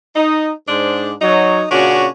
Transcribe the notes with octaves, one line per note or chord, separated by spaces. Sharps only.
D#4
G#2 D4 C5
F#3 D#4 C#5
A#2 C#3 C#4 D4 F#4